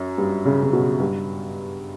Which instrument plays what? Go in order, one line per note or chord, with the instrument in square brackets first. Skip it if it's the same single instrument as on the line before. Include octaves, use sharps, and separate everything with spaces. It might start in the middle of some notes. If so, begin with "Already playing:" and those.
Already playing: [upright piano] F#2
G2
C#3
C#3
B2
G2